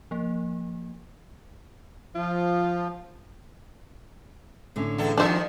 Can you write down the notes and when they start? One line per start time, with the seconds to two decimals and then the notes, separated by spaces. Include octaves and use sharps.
0.11 F3 A#3
2.15 F3 F4
4.76 A2 D3 C#4
4.98 E2 A4
5.18 G2 D#3 F3 D4 F#4 C5 E5